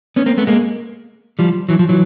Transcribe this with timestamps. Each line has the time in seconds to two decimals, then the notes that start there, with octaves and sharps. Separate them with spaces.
0.16 B3 C#4
0.26 A#3 C4
0.38 A3 B3
0.47 G#3 A#3
1.39 F3 G3
1.69 E3 F#3
1.79 F3
1.89 E3 F#3